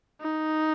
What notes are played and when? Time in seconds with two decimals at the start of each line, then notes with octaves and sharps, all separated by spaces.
0.21 D#4